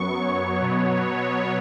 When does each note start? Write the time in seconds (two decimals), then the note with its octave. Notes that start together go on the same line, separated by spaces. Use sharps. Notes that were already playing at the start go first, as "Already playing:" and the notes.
Already playing: F#2 F#3 B3 C#6
0.19 C#5
0.60 B2 F#3 B3